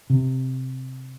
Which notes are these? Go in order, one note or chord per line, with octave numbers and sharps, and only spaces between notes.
C3